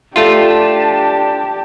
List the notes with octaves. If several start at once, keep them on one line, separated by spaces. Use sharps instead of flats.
A3 D4 F4 G4 A5